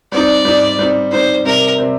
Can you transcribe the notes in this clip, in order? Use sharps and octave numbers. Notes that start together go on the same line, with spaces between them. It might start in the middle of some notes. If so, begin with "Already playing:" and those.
G3 C4 D#4 D5
G3 C4 D#4
G3 C4 D#4
G3 C4 D#4 C5
C3 G3 C4 A#4
C3 G3 C4